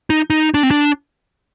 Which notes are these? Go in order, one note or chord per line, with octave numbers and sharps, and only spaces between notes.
D#4
D#4
D4
C4
D4